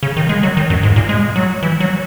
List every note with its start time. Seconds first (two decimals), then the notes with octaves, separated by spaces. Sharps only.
0.03 C#3
0.17 D#3
0.29 G#3
0.43 F#3
0.57 D#3
0.70 F#2
0.83 G#2
0.96 A#2
1.09 G#3
1.36 F#3
1.63 E3
1.80 F#3